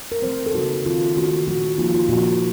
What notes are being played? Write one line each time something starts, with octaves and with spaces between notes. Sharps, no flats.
A#4
D#3 F#3 A3 C4 C5
A4
C#3 F#3 A#3 D#4 F#4
D#3 F#3 C4 F4
D#3 A3 C#4 F#4
A#2 F#3 A3 F#4
F3 A#3 D#4 F4
F4
A#2 F3 A#3 F#4